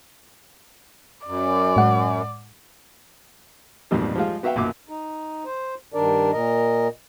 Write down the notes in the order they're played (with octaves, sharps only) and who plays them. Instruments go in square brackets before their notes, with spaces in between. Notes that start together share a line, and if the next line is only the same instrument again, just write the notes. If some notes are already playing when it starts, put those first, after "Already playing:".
[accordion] F#2 [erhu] D5
[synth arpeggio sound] A2 G#3 F#5
[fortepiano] A#1 F2 G#2 B2 G3
F3 G3 G#3 F4
B3 F#4 E5 F5 G5
B1 F#2 A#2 F#3 D6
[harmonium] D#4
C5
G2 D#3 D4 A#4 D5
A#2 A#4 D#5